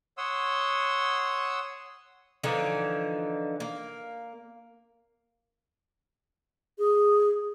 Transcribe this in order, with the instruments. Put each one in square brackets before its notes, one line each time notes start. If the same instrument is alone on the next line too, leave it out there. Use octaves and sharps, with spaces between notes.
[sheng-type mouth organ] C#5 F#5 C6 D#6 E6
[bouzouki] D3 E3 F3 D#4
A#3
[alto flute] G#4